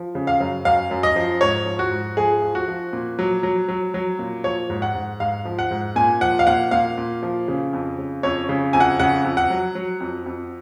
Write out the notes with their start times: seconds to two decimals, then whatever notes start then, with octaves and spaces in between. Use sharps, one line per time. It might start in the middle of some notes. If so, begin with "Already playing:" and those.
Already playing: F3
0.15 C#3
0.27 F5
0.40 F#2
0.65 F#2 F5
0.91 F#2
1.03 D#5
1.16 F3
1.41 G#2 C#5
1.66 F3
1.79 F#4
1.91 G#2
2.17 F3 G#4
2.42 F3
2.55 F#4
2.68 F3
2.93 A#2
3.19 F#3
3.43 F#3
3.69 F#3
3.94 F#3
4.19 A#2
4.44 F3 C#5
4.70 G#2
4.82 F#5
4.95 G#2
5.20 G#2 F5
5.45 F3
5.59 F#5
5.71 G#2
5.96 A#2 G#5
6.21 F3 F#5
6.39 F5
6.47 A#2 F#5
6.71 A#2 F5
6.98 A#2
7.23 F3
7.48 C#3
7.73 F2
7.98 C#3
8.23 F2 C#5
8.49 C#3
8.73 F2 G#5
8.80 F#5
8.99 C#3 F#5
9.24 F2
9.37 F#5
9.50 F#3
9.75 F#3
10.00 F2
10.26 F2